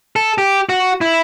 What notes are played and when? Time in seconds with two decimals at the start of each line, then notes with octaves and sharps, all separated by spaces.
0.16 A4
0.38 G4
0.69 F#4
1.01 E4